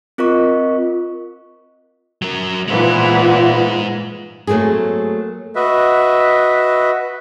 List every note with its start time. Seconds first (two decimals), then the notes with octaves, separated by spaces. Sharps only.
0.18 C4 F4 A#4 D#5 C#6
2.22 F#3 A#4
2.68 A#2 E3 G#3 B3 C5
4.47 F#3 A3 A#3 C4 G#4
5.56 F#4 B4 D#5 E5